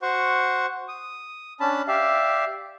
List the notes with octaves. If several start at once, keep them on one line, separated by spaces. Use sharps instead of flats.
F#4 C5 F#5 C#6
D#6
C#4 D4 A5 B5
G4 D5 E5 F5